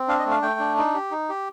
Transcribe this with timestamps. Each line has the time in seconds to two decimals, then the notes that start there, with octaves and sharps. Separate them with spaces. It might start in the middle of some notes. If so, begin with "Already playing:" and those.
Already playing: C4
0.08 D4 F5
0.19 D#5
0.26 A3
0.31 F5
0.42 A3 G5
0.60 D4
0.77 D#4
0.94 G4
1.11 D#4
1.29 G4